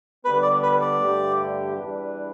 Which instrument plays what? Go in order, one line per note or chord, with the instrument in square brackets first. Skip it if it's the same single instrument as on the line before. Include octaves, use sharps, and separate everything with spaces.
[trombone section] D3 G3 B3 [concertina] B4
[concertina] D5
B4
D5
[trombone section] G2 D3 A3 G4
E2 E3 G3 D4 B4